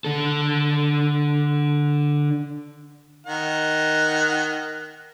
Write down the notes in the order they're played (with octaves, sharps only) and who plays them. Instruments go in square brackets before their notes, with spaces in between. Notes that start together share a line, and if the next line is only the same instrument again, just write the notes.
[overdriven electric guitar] D3 A4
[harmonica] D#3 F#5